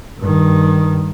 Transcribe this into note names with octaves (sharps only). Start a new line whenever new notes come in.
G2 D#3